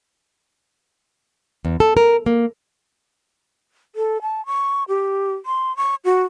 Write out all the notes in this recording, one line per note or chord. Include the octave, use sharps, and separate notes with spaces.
E2
A4
A#4
A#3
A4
A5
C#6
G4
C6
C#6
F#4